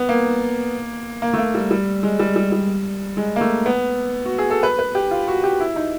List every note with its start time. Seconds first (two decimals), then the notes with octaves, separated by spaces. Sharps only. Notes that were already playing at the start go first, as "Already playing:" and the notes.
Already playing: B3
0.09 A#3
1.22 A#3
1.34 A3
1.38 A#3
1.54 G3
1.71 G3
2.03 G#3
2.19 G3
2.36 G3
2.52 G3
3.17 G#3
3.36 A#3
3.41 A3
3.66 B3
4.26 F#4
4.38 G#4
4.50 A4
4.63 B4
4.79 B4
4.95 G4
5.11 F4
5.28 F#4
5.43 G4
5.60 E4
5.76 D#4